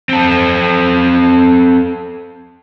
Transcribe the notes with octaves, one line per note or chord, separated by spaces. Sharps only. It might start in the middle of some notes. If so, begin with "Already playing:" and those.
C4 A4